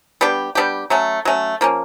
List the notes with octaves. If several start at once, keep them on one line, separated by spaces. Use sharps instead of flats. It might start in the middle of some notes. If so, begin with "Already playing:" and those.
G3 B3 D4 G4
G3 B3 D4 G4
F#3 A3 C#4
F#3 A3 C#4
F3 A#3 C#4